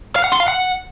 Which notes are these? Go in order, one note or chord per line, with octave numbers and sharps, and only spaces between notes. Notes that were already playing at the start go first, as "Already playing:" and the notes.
F5
F#5
C6
F5
F#5